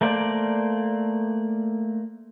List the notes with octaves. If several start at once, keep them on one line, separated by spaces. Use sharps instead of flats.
A3 A#3 C5 D5